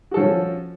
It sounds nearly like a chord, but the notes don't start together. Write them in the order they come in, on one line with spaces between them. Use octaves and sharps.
F#4 A4 F3 C#4